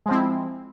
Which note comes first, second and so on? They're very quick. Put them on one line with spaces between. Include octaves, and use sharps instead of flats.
G#3 F3 C4 E4